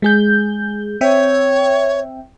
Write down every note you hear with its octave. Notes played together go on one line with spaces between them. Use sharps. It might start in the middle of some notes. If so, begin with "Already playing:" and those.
G#3 G#4 G6
C4 C#5 E5 G5